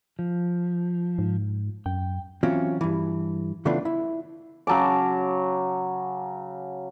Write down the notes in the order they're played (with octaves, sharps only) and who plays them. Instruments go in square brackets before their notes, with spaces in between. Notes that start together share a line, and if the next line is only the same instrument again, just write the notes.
[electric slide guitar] F3
[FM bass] G#2
[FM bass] F#2 [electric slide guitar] G5
[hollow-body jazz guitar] E3 F#3 C4 C#4 F4 F#4
G2 E3
C#3 E3 A3 B3 D4 F4
E4
[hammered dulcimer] C#3 F#3 A5 D6